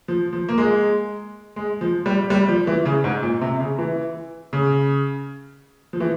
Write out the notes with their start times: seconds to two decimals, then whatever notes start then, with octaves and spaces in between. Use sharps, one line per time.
0.08 F3
0.33 F3
0.49 A#3
0.58 G#3
1.56 G#3
1.81 F3
2.06 G3
2.30 G3
2.48 F3
2.67 E3
2.85 C#3
3.04 G#2
3.23 A#2
3.41 C3
3.60 C#3
3.79 E3
4.53 C#3
5.93 F3
6.00 E3